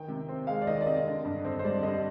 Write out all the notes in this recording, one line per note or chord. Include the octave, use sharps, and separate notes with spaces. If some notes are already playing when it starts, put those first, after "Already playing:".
Already playing: D#3 G5
C3
C4
G#3 F5
D5
D#3 D#5
D5
C3 D#5
D3
G2
C4
C5
G3 D5
D3 D#5